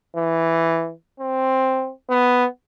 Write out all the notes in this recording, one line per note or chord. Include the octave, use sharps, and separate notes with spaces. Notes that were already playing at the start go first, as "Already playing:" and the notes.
E3
C4
B3